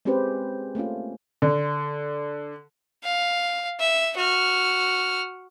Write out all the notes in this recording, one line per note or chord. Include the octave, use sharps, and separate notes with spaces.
G#3 C4 C#4 G4 B4 C5
A3 A#3 C#4 F4
D3
F5
E5
F#4 F6